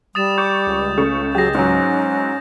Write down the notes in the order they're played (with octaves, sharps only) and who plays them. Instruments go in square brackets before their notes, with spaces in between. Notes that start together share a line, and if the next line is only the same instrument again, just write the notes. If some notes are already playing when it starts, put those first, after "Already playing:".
[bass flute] G3 [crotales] D#6 A6 E7
[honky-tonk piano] C#6 D6 [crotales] G6
[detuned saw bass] C#2
[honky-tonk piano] C#3 A3 C#6
[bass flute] F#3 [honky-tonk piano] G4 G#4 [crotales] G6 A#6
[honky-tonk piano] G#2 F#3 [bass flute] C#4